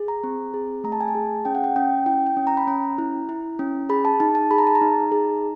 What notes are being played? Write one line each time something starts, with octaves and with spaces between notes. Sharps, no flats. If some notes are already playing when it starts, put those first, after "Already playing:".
Already playing: G#4
A#5
C4
G#4
A3 A#5
A5
G#5
A5
G#4
C#4 G5
F#5
G5
C#4 G5
E4 G5
G5
C#4
A#5
B5
C#4 A#5
E4
E4
C#4
G#4 B5
A5
D#4 A5
A5
G#4 B5
A#5
A5
A#5
D#4
G#4